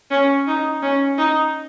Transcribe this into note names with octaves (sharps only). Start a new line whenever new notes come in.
C#4
D#4
C#4
D#4